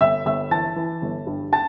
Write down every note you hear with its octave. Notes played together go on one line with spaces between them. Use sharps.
G1 E5 E6
G1 E5 E6
E3 A5 A6
E3
G1
G2
A5 A6